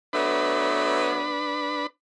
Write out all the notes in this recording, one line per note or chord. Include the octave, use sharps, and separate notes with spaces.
F#3 A3 B3 D4 B4 B5